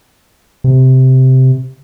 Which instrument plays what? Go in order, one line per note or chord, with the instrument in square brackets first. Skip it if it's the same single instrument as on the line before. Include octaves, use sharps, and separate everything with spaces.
[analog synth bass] C3